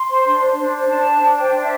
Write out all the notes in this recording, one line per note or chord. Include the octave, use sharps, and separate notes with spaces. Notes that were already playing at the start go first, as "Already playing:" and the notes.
Already playing: C6
C5
D4
C5
D4
C5
D4 A5
C5
D4
C5 G5
D4
E5